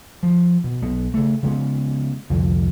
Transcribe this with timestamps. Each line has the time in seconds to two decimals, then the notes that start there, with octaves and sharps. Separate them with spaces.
0.23 F3
0.64 B2
0.82 B1 B3
1.14 C#3 A3
1.43 C#3 G#3 B3
2.30 C2 F2 D3